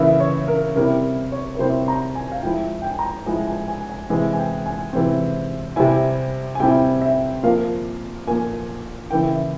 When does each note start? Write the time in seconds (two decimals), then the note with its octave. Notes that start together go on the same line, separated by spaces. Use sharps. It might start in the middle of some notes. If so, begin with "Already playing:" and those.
Already playing: C#3 E3 A#3 E4 E5
0.20 C#5
0.48 A#4
0.76 C3 G3 C4 E4 A#4
1.32 C#5
1.55 A#4
1.59 C3 G3 C4 E4 C5
1.88 A#5
2.15 G#5
2.32 F5
2.43 F3 G#3 E4 G5
2.82 G5
2.91 G#5
2.99 A#5
3.26 F3 G#3 E4 G#5
3.47 G#5
3.68 G#5
3.90 G#5
4.10 C3 E3 G#3 C4 G#5
4.33 G#5
4.37 G5
4.66 G#5
4.93 C3 E3 G#3 C4
5.76 C3 G3 C4 E4 G#5
6.55 G#5
6.60 C3 G3 C4 E4 G5
7.02 E5
7.43 A#2 F3 A#3 F5
8.27 A#2 F3 A#3 G#5
9.11 C#3 E3 A#3 E4 G5
9.31 E5